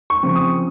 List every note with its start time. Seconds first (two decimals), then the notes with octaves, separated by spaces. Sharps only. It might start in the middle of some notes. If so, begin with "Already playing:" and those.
0.10 C#6
0.23 C#3 F3 C4
0.36 D#6